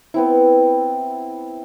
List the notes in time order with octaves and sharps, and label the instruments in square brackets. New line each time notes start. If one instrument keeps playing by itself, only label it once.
[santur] B3 C4 E4